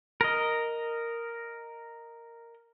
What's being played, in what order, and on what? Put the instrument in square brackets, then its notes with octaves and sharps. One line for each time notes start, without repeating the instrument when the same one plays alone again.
[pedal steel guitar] A#4 D#5